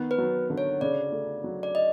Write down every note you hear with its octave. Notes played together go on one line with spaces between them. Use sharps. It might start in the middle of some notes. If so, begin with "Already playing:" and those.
Already playing: D#3 B3
B4
F#3
D3
C#5
C#3 D5
A3
F#3
D5
D#5